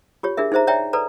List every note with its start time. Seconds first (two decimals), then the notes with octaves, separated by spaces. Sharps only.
0.23 F4 G4 C#5
0.37 D4 G#4 A#4 E5
0.52 D#4 G#4 C5 E5 A#5
0.67 C#5 D5 E5 G5 A#5
0.93 A4 B4 D5 A#5